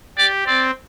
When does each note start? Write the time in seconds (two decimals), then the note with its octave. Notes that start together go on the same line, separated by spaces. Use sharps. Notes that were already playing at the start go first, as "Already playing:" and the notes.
0.18 G4 D5
0.47 C4 D5